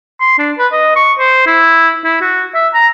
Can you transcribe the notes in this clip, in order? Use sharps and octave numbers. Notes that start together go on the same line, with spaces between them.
C6
D4
B4
D#5
C#6
C5
E4
E4
F#4
E5
A#5